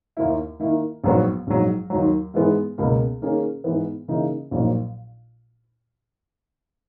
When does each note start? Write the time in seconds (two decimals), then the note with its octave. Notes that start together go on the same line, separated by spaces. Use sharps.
0.17 D#2 D#3 A#3 E4
0.60 D#3 A#3 E4
1.04 A#1 G#2 F#3 B3 F#4
1.47 A#1 G#2 F#3
1.90 D#2 D#3 F#3
2.34 G#2 E3 G#3 B3
2.78 C#2 B2 A#3
3.22 D#3 A#3 C#4 G#4
3.64 G#2 E3 B3
4.08 C#3 E3 A#3 D#4
4.51 A#1 A#2 F#3 A#3 D#4